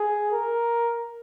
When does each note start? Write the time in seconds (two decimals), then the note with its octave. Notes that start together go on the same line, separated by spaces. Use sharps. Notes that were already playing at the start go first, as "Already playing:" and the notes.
Already playing: G#4
0.32 A#4